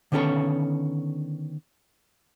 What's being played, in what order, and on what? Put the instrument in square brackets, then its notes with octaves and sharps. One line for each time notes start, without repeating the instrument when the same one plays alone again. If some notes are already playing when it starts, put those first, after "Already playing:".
[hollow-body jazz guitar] D3 D#3 B3 C#4 A4 C#5